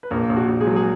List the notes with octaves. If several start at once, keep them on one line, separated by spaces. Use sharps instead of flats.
B4
A#1 A#3 A#4
A#1
F#4
A#1
G#3 G#4
F#3
G#4